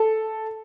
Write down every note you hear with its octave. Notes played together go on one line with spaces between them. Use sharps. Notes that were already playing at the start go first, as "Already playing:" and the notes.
Already playing: A4